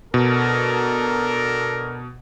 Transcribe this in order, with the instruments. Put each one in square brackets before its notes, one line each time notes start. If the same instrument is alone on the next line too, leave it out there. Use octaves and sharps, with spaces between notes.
[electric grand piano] B2 [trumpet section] D4 A4 A#4